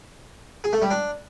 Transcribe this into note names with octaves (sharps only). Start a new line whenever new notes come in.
G#4
A3
G3
D4